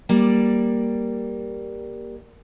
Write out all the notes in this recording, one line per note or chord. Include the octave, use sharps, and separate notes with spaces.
G3 A#3 D5